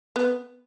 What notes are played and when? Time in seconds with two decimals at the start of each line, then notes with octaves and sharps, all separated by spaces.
0.16 B3